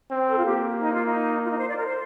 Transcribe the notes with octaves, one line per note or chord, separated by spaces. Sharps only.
C4
A4
F4
A#3 G4
D#4
F4
D#4
F4
D#4
C5
D5
A#4
C5